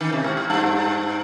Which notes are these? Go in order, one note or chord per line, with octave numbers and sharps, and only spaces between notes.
D#3
C3
G#2
G#2
G2